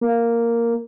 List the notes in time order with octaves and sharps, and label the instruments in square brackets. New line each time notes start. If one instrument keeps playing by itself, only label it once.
[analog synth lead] A#3